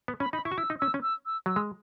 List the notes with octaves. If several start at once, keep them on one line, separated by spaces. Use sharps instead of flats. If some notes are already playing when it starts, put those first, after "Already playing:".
B3
C#4 B5
D#4 B5
E4 C#6
F#4
E4 E6
D#4
C#4 E6
C#4
E6
E6
F#3 E6
G#3